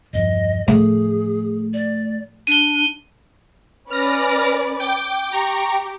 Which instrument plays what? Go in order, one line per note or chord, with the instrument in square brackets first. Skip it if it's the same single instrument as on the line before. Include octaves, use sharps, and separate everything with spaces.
[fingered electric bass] E1 G2 F3 [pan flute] D#5
[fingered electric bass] A2 D3 F3 [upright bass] A3 [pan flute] G#4
[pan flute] D5
[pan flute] D4 [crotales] D#7 G7
[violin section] C#4 B4 D5 [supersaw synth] F6 A#6
[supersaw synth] G5 D6
[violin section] G4 [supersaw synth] A#5 C#6